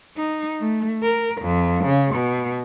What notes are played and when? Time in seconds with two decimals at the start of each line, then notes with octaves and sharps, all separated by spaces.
0.17 D#4
0.60 A3
1.03 A#4
1.41 F2
1.85 C#3
2.14 B2